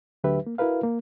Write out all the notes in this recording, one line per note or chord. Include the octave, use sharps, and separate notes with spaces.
D2 D3 F#3 G4 B4 E5
A#3
E4 F#4 A#4 B4 F5
A#3